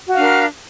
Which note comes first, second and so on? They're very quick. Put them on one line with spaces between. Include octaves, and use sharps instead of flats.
F#4 F5 D4 A#4